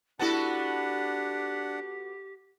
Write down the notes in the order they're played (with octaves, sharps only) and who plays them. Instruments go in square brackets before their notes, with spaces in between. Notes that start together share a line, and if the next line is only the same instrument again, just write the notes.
[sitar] B3 F#4 A4 [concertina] D4 F#5 [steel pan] E4 A5 [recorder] G4